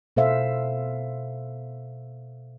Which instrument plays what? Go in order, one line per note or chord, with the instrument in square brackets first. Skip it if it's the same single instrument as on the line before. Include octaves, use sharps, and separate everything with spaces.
[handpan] B2 A4 C5 E5 F5